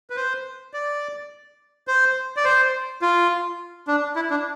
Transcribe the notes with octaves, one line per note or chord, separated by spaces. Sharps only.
B4
C5
D5
C5
D5
C5
F4
D4
E4
D4